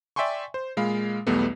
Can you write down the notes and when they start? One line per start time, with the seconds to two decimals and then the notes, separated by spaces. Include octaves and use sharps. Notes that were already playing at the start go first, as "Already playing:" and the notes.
0.16 D5 E5 G5 G#5 C6 C#6
0.54 C5
0.77 A#2 G#3 F5 B5
1.27 B1 E2 G3 A3 B3